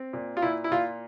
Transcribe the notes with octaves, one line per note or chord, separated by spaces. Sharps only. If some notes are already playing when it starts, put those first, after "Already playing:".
Already playing: C4
A#2
F4
A#2 E4
E4
A#2 F4